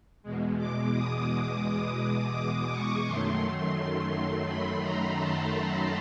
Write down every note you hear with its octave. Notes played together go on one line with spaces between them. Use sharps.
E2 B2 G#3
D6
D#6
D6
C#6
F#2 D#3 F#3 A3 C6
B5
A#5
A5